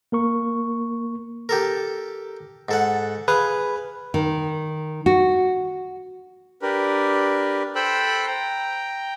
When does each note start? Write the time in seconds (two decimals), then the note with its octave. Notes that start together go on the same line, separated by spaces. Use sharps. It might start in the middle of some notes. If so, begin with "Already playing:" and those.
0.12 A#3 A#4 C#6
1.49 G4 A4 A#4
2.69 G#2 A4 F#5
3.28 G#4 B4 F5
4.14 D#3
5.06 F#4
6.61 D4 G4 A#4 B4
7.75 A4 C5 G5 B5 E6 F#6
8.26 G5 A#5